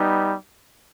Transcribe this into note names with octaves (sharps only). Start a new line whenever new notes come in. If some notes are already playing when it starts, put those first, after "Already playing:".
Already playing: G3 B3 D#4